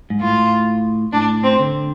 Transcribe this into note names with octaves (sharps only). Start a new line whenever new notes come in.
G#2
A2 F4
A2 D4
C4
D3